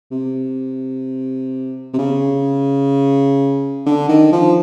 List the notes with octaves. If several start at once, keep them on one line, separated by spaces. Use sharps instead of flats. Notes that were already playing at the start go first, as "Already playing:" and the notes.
C3
C3
C#3
D3
D#3
F3